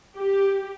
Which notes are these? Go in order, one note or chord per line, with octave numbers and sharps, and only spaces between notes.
G4